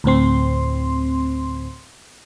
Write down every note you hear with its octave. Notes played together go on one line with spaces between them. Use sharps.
D2 A2 C4 C6